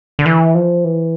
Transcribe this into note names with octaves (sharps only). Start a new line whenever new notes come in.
D3
E3
F3
E3